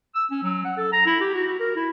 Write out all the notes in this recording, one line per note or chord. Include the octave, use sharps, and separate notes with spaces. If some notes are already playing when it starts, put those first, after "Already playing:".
E6
C#4
F#3
F#5
A4
A#5
E4
G4
F#4
F#4
A#4
E4